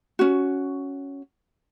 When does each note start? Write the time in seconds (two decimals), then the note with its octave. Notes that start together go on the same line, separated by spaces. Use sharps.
0.19 C#4 F#4